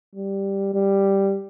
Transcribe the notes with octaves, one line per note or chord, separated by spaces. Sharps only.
G3
G3